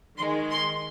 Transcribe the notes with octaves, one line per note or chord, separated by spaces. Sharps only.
D#3 G#3 C6
C6